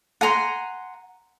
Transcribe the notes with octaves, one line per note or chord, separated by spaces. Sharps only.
F#5 G#5 A#5 C6